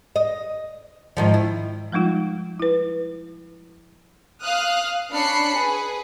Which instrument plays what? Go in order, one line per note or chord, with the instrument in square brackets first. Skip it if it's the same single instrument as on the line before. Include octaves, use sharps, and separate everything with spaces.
[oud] D#5
G#2 D#3 F3
E4
[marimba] F3 G3 G#3 D#4 F4
E4 B4
[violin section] F5 D#6 F6 F#6
C#4 D4 B5 F#6 C7 C#7
G#4 B4